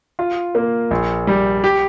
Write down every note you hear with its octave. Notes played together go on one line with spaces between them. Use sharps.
F4
A#3
A#1
G3
G4